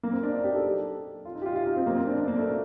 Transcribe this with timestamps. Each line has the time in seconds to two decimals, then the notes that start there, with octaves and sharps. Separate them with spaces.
0.03 A#3
0.13 C4
0.23 D4
0.34 D#4
0.44 G4
0.54 A4
1.25 F4
1.35 D#4
1.42 G4
1.46 F4
1.56 F4
1.66 D#4
1.77 C4
1.86 A#3
1.97 C4
2.07 D4
2.17 D4
2.28 A#3
2.37 A3